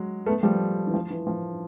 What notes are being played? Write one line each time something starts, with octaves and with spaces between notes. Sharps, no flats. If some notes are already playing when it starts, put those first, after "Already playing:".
Already playing: F#3 G#3
A3 B3
F3 G3
E3
F3
E3
F3